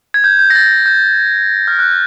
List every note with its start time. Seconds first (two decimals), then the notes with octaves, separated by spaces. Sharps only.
0.14 G#6
0.24 G6
0.39 G6
0.50 A#6
0.56 A6
0.86 G6
1.68 F6
1.79 F#6